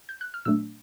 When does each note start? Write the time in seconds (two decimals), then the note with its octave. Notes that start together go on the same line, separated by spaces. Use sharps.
0.09 G6
0.21 F#6
0.34 F6
0.45 A#2 F#3 A3 D4 E6